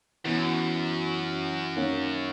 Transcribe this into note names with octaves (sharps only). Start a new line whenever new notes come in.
F#2 E3 B3 E4
D#3 A#3 C#4